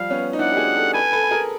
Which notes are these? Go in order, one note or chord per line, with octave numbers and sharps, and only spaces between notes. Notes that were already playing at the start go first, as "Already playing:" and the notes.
Already playing: F3 G3 F5
B3 C#4
D#4
D4 E4 F#5
G4
F#4 G#4
G4 A4
A4 B4 G#5
A4 B4
B4
G#4 A#4